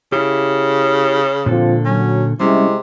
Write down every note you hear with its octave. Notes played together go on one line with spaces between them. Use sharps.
C#3 E4 G4
A#2 D3 F3 C4 F4 A4
F#3 C#4
C3 G3 G#3 C#4 E4